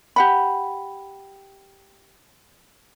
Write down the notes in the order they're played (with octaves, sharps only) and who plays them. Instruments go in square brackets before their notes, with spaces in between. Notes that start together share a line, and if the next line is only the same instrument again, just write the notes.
[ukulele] G4 F#5 B5